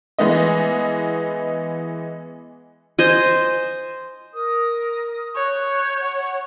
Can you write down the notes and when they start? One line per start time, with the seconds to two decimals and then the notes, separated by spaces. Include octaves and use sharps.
0.19 E3 G#3 B3 D#5
2.99 C5 D#5 G#5
4.33 A#4 D#6
5.36 C#5 F#6 G6
6.00 F#5